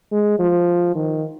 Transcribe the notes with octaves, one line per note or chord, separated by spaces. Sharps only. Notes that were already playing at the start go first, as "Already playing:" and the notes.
G#3
F3
D#3